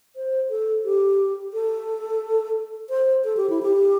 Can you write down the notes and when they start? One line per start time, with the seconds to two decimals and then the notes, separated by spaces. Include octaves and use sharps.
0.16 C5
0.50 A4
0.85 G4
1.53 A4
2.90 C5
3.25 A4
3.37 G4
3.50 E4
3.63 G4